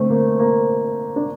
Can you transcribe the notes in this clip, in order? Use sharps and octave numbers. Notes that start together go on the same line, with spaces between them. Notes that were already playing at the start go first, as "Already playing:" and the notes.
Already playing: D3 A3 C4
A#3
A#3
D4